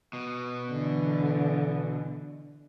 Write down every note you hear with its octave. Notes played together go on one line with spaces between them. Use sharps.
B2
D3 E3